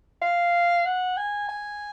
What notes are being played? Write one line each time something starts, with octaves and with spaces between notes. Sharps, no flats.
F5
F#5
G#5
G#5